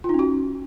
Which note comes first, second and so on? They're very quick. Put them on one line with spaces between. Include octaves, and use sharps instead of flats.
F4 D#4 C#4 F#4